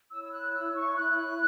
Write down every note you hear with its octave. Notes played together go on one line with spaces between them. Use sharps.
E4 C#5 E6
E6
F#6
E6
C#6
F#6